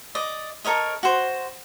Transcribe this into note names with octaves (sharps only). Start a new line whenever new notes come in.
D5 D#5
A4 A#4 C#5 D#5
F#4 C5